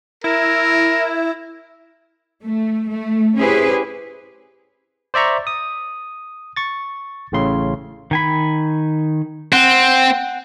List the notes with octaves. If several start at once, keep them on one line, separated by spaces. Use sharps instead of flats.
E4 A#4
A3
A3
C#4 E4 G4 G#4 B4 C5
C5 D5 E5 A#5 C#6
D#6
C#6 A6
A1 A2 C#3 C6
D#3 G#5 B5
C4 F#5 G5